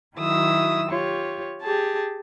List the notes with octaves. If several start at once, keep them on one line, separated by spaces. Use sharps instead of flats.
D#3 F#3 E4 F#4 D#6 E6
F4 G4 C#5
G4 G#4 A5